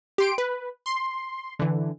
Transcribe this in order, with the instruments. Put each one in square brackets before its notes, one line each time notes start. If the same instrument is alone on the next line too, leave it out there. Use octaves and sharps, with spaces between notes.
[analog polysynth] G4 C6 D7
B4
C6
D3 E3